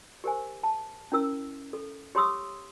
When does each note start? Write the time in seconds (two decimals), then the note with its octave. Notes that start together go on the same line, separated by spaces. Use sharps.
0.24 G4 A#4 C5 G#5
0.63 A5
1.12 C#4 E4 A#4 E6
1.73 A4
2.15 G4 C#5 C6 C#6 D#6 E6